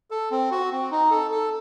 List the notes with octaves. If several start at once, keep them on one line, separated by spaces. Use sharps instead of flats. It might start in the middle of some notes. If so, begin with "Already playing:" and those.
A4
C4
F#4
C4
D#4
A4
A4